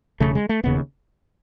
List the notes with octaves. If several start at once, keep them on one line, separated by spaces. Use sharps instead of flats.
E1 D#2 C#3 A3
G#3
A3
E1 D#2 C#3 B3